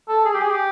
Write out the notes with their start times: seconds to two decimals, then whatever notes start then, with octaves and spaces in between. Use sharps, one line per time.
0.08 A4
0.25 G#4
0.34 G4
0.42 G#4
0.51 G4